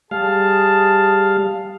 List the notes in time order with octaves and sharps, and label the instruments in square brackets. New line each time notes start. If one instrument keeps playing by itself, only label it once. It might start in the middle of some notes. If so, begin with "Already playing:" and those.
[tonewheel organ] G3 F5 [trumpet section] G#4 A5